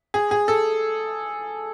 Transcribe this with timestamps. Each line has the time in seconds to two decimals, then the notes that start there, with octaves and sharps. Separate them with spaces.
0.14 G#4
0.31 G#4
0.48 A4